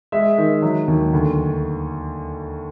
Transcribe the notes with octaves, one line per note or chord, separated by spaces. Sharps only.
G#3 E5
D#3
F#3
D#2
D2